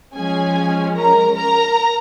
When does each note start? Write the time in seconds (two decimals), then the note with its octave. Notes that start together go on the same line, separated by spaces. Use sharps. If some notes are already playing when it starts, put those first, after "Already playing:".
0.15 F3 G#3 C#4 G#4 G#5
0.95 A#4 A#5
1.35 A#4 A#5